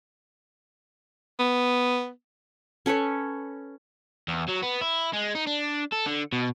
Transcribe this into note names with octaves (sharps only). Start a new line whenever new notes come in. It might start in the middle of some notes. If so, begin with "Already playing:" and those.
B3
C#4 A4 B4 C#5
E2
F#3
B3
E4
G#3
D#4
D4
A4
D3
B2